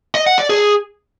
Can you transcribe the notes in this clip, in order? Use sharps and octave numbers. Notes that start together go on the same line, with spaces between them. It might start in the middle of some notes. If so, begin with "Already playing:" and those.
D#5
F#5
D5
G#4